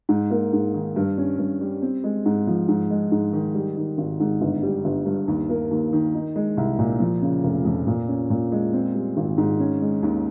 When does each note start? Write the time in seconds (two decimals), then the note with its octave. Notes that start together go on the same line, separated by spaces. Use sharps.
0.09 G#2
0.30 A#3
0.53 G#2
0.74 D#3
0.96 G2
1.18 C#4
1.39 G2
1.61 G3
1.82 C4
2.04 G#3
2.26 G#2
2.47 F3
2.69 G#2
2.90 G#3
3.12 G#2
3.33 D#3
3.55 G3
3.76 D#3
3.98 G#1
4.20 G#2
4.41 G1
4.63 G3
4.85 G1
5.06 G2
5.28 D#2
5.49 A#3
5.71 D#2
5.93 D#3
6.15 D#4
6.36 G#3
6.57 C2
6.79 A#2
7.00 F3
7.22 C#3
7.44 F1
7.65 F2
7.87 A#2
8.09 C#4
8.30 A#2
8.52 G#3
8.73 C4
8.95 G3
9.17 G#1
9.38 G#2
9.60 C#4
9.81 G#3
10.03 D#2